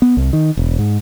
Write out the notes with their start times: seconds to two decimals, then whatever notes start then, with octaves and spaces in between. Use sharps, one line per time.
0.02 B3
0.17 C2
0.33 D#3
0.57 E1
0.79 G#2